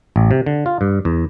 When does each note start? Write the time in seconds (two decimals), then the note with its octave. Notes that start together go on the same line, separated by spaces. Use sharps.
0.16 A1
0.31 C3
0.46 D3
0.66 F4
0.81 G2
1.05 E2